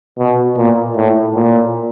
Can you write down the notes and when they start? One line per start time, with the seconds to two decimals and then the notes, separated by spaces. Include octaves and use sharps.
0.19 B2
0.57 A#2
0.96 A2
1.35 A#2